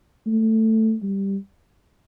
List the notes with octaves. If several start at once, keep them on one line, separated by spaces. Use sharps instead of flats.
A3
G3